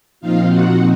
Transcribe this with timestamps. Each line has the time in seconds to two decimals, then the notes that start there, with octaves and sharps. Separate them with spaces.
0.21 A#2 F3 C4 D#4 F4 F5
0.49 F#4 F#5